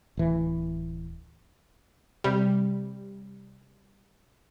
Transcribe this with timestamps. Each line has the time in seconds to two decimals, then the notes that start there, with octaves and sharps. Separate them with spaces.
0.17 D1 E3
2.24 C3 G3